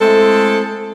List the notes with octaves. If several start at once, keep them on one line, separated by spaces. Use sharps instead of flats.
G#3 A3 C4 E4 A4